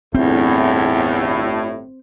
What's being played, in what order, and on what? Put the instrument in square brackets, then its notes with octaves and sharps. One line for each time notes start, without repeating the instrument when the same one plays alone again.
[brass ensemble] G1 A2 [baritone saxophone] E2 [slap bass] C4